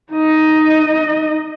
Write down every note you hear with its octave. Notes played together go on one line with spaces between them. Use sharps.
D#4 D#5